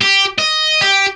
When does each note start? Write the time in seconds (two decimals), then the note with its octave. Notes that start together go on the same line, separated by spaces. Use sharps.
0.01 G4
0.38 D#5
0.81 G4